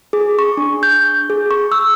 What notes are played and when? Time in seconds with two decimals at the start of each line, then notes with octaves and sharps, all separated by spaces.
0.13 G#4
0.39 C#6
0.57 D4
0.83 G6
1.30 G#4
1.51 C#6
1.72 E6